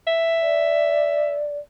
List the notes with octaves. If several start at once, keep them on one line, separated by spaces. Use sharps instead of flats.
E5
D5